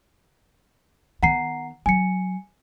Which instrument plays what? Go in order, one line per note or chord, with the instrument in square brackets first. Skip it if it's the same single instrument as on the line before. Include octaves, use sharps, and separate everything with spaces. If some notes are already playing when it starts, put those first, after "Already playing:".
[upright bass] D#3 B3 [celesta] F#5 A#5 C7
[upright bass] F#3 [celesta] G#5 C#7